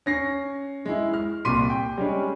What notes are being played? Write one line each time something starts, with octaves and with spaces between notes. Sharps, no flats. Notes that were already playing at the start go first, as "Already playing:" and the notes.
C#4 A#6 C7
G#3 E4
F6
C2 A#2 C6 D6 B6 D#7
G5
G3 G#3 C#4